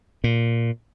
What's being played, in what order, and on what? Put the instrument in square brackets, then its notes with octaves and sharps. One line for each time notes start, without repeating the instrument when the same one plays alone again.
[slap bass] A#2